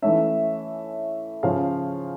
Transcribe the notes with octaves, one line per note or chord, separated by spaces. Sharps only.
E3 A3 C#4 E5
C#3 F3 C#4 F5